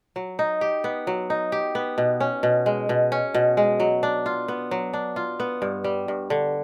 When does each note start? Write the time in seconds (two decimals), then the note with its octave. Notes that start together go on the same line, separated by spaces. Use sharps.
0.16 F#3
0.39 D#4
0.61 G4
0.84 B3
1.07 F#3
1.30 D#4
1.52 G4
1.75 B3
1.98 B2
2.20 C#4
2.43 B2
2.66 G#3
2.89 B2
3.12 C#4
3.34 B2
3.57 G#3
3.80 F#3
4.03 D4
4.26 F4
4.48 B3
4.71 F#3
4.93 D4
5.16 F4
5.40 B3
5.62 G2
5.84 G3
6.08 G2
6.30 D3